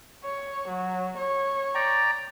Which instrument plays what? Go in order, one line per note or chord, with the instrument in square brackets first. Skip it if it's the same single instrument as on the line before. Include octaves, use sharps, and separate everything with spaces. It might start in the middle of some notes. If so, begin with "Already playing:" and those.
[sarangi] C#5
F#3
C#5
[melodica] D5 G5 A#5